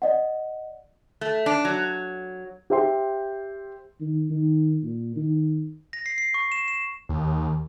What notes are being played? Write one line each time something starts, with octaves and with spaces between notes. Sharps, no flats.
D5 D#5 F#5
A3
D4
F#3
G4 C5 E5 G5 C6
D#3
D#3
A#2
D#3
A#6
C7
C7
C#6
E7
E7
D#2